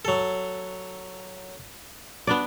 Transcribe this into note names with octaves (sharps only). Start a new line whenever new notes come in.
F#3 A4
B3 D4 D5